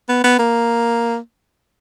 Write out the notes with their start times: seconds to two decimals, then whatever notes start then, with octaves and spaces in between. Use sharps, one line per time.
0.09 B3
0.24 B3
0.39 A#3